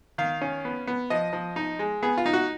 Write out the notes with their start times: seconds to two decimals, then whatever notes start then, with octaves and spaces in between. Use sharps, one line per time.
0.18 D#3 F5
0.41 C#4
0.65 B3
0.87 B3
1.10 F3 D#5
1.33 F3
1.56 D#4
1.79 G#3
2.03 B3 G#4
2.18 F4
2.26 D#4
2.33 F#4